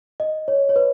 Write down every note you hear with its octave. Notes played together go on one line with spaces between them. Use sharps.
D#5
C#5
C#5
B4